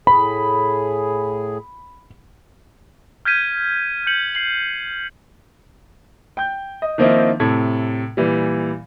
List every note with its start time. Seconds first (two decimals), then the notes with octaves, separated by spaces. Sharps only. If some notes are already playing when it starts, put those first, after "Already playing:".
0.07 A2 G#4 B5
3.25 F6 G6 G#6 B6 D#7
4.07 G6 C#7 F#7
4.35 C7 F#7
6.37 G5 G6
6.82 D#5
6.98 D#3 F3 A#3 C4 D#4 E4
7.40 A2 C3 A4 G#6
8.17 A#2 E3 G3